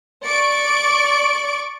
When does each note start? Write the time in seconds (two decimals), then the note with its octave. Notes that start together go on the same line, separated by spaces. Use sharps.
0.22 D5 C#6 D7